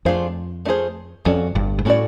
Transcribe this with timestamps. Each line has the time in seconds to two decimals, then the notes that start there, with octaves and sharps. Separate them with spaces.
0.05 F2 A3 D4 F4 G#4 C5
0.65 A3 D4 F4 G#4 C5
1.25 F2 C#4 F#4 A4 D5
1.55 G1 G2
1.79 G#2
1.85 A2 C#4 F#4 A4 D5